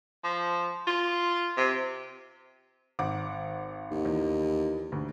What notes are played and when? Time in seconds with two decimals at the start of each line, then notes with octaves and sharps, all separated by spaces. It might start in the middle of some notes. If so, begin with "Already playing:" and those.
0.24 F3
0.87 F4
1.57 C3
2.99 G#1 F#5 D6
3.91 D#2
4.05 E2
4.92 D2